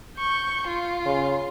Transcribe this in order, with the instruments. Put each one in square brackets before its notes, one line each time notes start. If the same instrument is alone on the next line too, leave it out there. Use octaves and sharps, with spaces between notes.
[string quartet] C#6 G6
F4
[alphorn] C#3